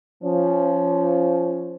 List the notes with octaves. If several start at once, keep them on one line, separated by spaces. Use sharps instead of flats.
F3 C#4